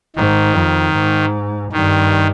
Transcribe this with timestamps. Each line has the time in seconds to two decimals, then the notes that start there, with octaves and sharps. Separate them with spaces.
0.16 G#2 D#3
0.55 F2
0.94 G#2
1.72 G2 D#3